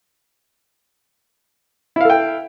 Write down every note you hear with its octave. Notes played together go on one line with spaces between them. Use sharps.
E4 A4 F5 G5